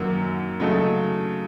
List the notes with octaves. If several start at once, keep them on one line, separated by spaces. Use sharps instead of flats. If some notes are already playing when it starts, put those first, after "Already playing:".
Already playing: F#2 D#3 F#3 A#3
C#3 F#3 A3 D#4 A4